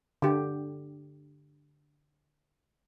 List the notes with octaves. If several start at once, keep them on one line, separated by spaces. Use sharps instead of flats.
D3 G4